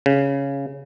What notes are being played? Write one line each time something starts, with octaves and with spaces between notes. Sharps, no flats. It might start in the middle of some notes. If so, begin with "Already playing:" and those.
C#3